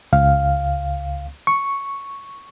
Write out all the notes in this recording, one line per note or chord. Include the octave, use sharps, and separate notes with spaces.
C#2 F5
C#6